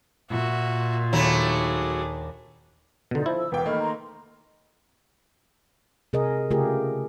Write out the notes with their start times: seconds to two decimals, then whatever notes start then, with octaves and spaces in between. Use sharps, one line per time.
0.30 A#2 F#4 E5
1.13 D#2 F#3 A3 D4 G#4 G5 B5
3.11 B2 D3 D#4 F4 D5
3.26 F3 E4
3.38 E6
3.52 E1 B3 B4 F5 G5 D6
3.66 D#3 A3 A#3 D#4 B5 F6
3.80 D#5 A#5 C6
6.13 C3 G#4 A#4 D#5
6.50 C#3 A3 F4 G4 G#4 A#4